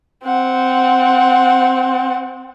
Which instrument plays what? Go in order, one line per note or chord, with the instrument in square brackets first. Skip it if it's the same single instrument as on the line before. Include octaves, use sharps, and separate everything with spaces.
[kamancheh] C4 F#5